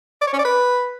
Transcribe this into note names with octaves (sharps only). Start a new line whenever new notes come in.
D5
C#5
C#4
D5
B4